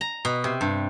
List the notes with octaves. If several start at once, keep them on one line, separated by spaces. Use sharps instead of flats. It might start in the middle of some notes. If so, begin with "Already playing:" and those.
A#5
B2
C3
G2